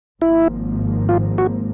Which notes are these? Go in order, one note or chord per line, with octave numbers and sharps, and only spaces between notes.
G#1 G#2 F3 A#3 E4
F4
F#4